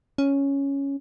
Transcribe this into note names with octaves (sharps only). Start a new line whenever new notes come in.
C#4